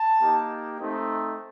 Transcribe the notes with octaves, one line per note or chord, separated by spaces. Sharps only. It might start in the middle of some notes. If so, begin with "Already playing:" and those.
Already playing: A5
A#3 D#4 G4
A3 C4 D#4